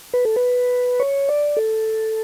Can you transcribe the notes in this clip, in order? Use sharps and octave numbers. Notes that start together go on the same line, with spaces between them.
B4
A4
B4
C#5
D5
A4